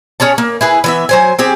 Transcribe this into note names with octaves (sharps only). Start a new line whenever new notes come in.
C#4 G#4 C#5 A5
A#3
E4 G#4 B4
E3 B3 E5
F#3 C5 G#5
C4 G4 G#4